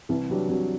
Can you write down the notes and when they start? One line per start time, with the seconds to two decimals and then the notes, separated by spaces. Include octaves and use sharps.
0.09 C2 E3
0.30 C3 E3 F#3 G3 D4
0.49 C2 F#3